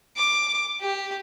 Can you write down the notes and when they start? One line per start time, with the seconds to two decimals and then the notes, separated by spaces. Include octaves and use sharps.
0.17 D6
0.81 G4